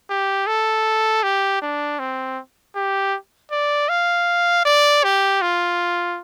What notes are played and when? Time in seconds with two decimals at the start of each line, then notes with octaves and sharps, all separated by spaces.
0.10 G4
0.47 A4
1.23 G4
1.62 D4
1.99 C4
2.76 G4
3.52 D5
3.89 F5
4.65 D5
5.04 G4
5.42 F4